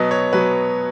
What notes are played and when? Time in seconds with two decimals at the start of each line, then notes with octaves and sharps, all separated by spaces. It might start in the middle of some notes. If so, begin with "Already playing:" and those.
Already playing: B2 F#3 B3 D#5
0.11 C#5
0.33 B2 F#3 B3 B4